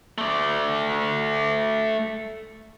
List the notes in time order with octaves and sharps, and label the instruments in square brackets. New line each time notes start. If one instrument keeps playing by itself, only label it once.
[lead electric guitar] A3 D5